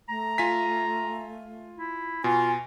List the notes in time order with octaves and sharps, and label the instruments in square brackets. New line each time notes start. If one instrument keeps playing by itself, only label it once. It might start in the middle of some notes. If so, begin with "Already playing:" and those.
[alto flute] A3 [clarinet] A#5
[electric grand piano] F4 G#5 B6
[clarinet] E4
[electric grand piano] B2 [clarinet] F4 [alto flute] G#5